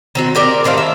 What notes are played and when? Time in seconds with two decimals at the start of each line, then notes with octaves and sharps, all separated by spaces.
0.15 D#3 C4 F#4
0.35 C4 G4 A#4 D5
0.64 A2 D#3 C4 F5
0.78 E5